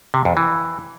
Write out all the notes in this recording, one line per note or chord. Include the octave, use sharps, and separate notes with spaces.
C3
F2
E3